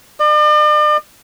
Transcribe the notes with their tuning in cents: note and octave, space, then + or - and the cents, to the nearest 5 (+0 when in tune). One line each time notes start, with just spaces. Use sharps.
D5 +45